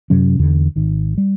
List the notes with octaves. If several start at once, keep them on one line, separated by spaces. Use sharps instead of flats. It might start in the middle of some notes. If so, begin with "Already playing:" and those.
F#2 C3 F#3 C#4
E2 D3
G#1 D#3
G3